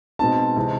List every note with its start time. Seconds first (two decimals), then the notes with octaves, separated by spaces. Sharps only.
0.19 B2 G#3 C4 D#4 A5
0.56 C3 E3 G#3